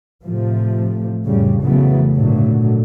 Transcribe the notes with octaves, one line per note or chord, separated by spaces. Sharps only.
A2 C3 F3 A3
F2 A2 C#3 G3
F1 C#3 E3 F#3 A3 B3
G#1 A#2 D3 F#3 A3